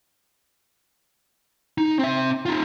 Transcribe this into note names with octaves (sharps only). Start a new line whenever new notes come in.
D#4
C4 E5
D#4 F4